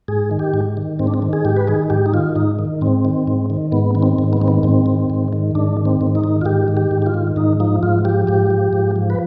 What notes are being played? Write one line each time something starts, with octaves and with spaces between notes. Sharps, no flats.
G#2 G#4
D#3
G4
G#2
D#3
G#2 C4
D4
C4
D#3
G#4
G#2 G4
B4
D#3 G#4
G#2 G4
D#4
D#3 F4
G#2 D#4
D#3
G#2 C4
D#3
G#2
D#3
G#2 B3
D#3 B3
C4
G#2
B3
D#3 C4
B3
G#2 C4
D#3
G#2
D#3
G#2 D4
D#3
C4
G#2
D#4
D#3
F4
G#2 G4
D#3
G4
G#2
G4
F4
D#3
G#2 D#4
F3 D#4
G#2 F4
F3 G4
G#2 G4
F3
G#2
F3
B4